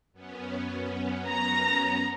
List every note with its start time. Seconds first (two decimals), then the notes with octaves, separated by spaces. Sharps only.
0.13 F#2 B3 C#4
1.28 A#5